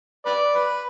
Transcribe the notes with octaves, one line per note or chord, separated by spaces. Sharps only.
B4 D5
B4